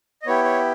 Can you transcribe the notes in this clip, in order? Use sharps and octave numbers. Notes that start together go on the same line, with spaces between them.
D#5
B3 E4 G4 C#5
C#5